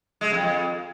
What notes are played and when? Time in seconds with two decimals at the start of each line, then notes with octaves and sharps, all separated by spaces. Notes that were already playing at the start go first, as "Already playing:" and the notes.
0.21 G#3
0.32 F2
0.42 F2